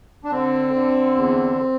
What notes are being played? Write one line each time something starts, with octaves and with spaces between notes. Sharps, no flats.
D4
D3 C4
D3
E2